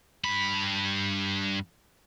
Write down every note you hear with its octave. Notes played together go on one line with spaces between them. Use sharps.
G2 B5